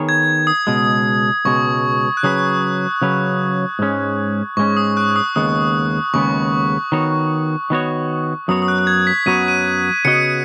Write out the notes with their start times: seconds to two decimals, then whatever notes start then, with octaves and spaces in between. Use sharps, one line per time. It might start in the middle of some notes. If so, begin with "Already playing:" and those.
Already playing: D#3 B3 G#4 C#5
0.09 G#6
0.47 D#6
0.67 C#2 B2 G#3
1.45 C#2 B2 G#3 C#6
2.17 F#6
2.23 C#3 F#3 C#4 G#4 B4 D#6
3.02 C#3 F#3 C#4 G#4 B4
3.79 G#2 G#3 C#4
4.57 G#2 G#3 C#4 C#6
4.77 D#6
4.97 F#6
5.16 D#6
5.36 D#2 C#3 G#3 B3 D#6
6.14 D#2 C#3 G#3 B3 C#6
6.92 D#3 B3 F#4 C#5
7.70 D#3 B3 F#4 C#5
8.48 F#2 F#3 B3 F#4 C#5 D#6
8.62 D#6
8.68 F#6
8.79 F#6
8.87 G#6
9.07 B6
9.26 F#2 F#3 B3 F#4 C#5 D#7
9.48 D#7
10.05 C#3 B3 F#4 D#5 C#7